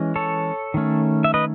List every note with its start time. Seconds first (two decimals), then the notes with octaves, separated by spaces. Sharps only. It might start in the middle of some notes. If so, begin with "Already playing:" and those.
Already playing: E3 G#3 C#4
0.16 A4 C#5
0.74 D#3 A3 C#4
1.24 E5
1.34 B4 D#5